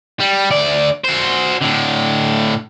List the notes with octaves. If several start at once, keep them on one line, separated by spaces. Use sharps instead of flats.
G3
D2 D5
F#4 C5
A2 D3